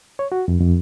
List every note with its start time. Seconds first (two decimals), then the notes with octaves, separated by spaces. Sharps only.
0.19 C#5
0.32 F#4
0.48 F2
0.61 F2